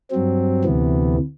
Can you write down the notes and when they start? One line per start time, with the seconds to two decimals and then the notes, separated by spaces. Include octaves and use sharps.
0.11 G2 F#3 C4
0.64 D2 C3 E3 B3